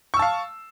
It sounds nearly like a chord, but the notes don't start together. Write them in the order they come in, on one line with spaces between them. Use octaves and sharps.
C#6 E6 A5 F5